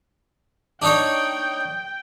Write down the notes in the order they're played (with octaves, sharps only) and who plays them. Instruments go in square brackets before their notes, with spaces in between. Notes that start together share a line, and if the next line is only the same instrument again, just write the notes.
[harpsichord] D4 D#4 C#5 [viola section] G5